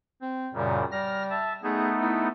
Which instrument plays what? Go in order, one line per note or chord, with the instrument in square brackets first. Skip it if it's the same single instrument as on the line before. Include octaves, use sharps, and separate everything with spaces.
[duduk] C4
[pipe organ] F#2 A#2 C#3 [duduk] G3
[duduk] G3 [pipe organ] F6 A#6
[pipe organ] E5 A5
[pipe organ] A3 B3 D#4 [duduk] G#4
[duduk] E4